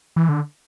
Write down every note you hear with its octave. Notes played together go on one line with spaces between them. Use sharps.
E3
D3